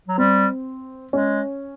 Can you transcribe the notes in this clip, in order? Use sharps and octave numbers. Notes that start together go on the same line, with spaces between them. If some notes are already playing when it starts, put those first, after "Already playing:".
F#3
G3 C4
G#3 C#4